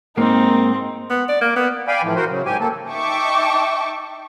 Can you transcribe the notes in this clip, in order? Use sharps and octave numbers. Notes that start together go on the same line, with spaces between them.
G#2 A#3 C4 D#4
B3
D5
A#3
B3
D5 F5 G5 G#5 B5
A2 E3 F3
F#4 A#4 C5
C#3 F#3
G#2 G4 G#5
A#3 A4
D#4 E5 G5 A5 C#6 D6